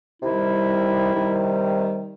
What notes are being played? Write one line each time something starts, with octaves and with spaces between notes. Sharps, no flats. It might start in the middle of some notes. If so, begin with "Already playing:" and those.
C3 D#3 G3 E4
C3 D#3 G3